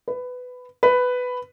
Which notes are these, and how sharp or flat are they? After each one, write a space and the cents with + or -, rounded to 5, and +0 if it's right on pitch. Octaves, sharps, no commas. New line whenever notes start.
B4 +15
B4 +10